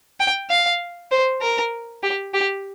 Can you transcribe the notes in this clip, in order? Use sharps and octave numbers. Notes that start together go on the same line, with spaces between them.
G5
F5
C5
A#4
G4
G4